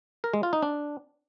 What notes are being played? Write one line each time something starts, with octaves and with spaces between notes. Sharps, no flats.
A#4
G#3
F4
D#4
D4